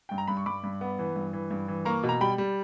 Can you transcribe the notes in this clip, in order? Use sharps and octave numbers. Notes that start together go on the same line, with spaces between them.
G2 G5
A#5
G2 B5
C#6
G2 B5 D6
G2
B3
E3
G2
E3
G2
E3
A#3 A#5 C#6
B2
A#5
G3 G5 B5
G3